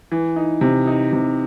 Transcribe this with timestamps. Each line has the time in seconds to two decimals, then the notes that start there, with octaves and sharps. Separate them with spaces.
0.12 E3
0.36 D#4
0.61 C3
0.87 D#4
1.13 C3